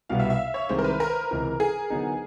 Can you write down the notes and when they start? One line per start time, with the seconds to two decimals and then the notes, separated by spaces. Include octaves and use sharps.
0.09 C2 B2 G3 B3 F5
0.20 E5
0.30 E5
0.54 C#5
0.69 C2 C3 D#3 G#3 C5
0.79 A#4
0.84 B4
1.00 A#4
1.31 C#2 C3 E3
1.60 G#4
1.90 D3 F#3 B3 D#4